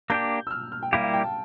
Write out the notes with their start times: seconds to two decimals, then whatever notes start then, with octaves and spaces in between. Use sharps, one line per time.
0.10 A#3 D4 G4 G6
0.47 E6
0.51 F6
0.72 F6
0.83 G5
0.92 G3 A#3 E4 G4 F5
1.03 F5
1.14 G5
1.24 A5